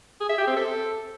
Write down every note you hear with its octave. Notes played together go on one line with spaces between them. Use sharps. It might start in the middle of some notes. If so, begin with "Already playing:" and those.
G#4
E5
G4
C4
A4